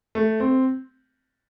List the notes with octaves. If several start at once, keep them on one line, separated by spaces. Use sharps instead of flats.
A3
C4